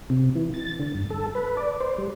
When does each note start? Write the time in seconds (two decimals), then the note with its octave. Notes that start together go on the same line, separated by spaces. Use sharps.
0.10 C3
0.35 E3
0.54 A6
0.79 D3
0.95 G2
1.10 A4
1.35 B4
1.57 D5
1.80 C5
1.98 G3